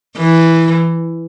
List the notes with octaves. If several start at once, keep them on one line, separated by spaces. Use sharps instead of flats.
E3